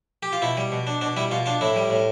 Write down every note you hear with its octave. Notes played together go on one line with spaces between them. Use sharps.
G4
F4
B2 E4
G3
B2
D4
B2 D4
G3 E4
B2 F4
D4 F4
A2 E4
G3
A2